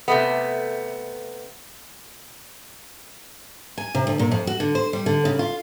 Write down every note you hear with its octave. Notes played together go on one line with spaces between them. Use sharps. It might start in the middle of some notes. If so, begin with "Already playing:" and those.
C3 A3 B3
G#5
C3
D2
A#2
F2
F#4
D3
C5
G3
D3
C#3
F4